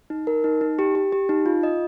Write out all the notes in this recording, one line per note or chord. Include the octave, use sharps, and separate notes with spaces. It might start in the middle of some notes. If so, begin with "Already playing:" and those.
D#4
A#4
D#4
D#4
G4
G4
G4
D#4
F4
D#5